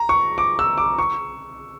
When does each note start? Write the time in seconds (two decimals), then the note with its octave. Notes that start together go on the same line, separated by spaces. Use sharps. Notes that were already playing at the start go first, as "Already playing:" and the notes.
Already playing: A#5
0.09 C#6
0.38 D6
0.59 E6
0.78 D6
0.99 C#6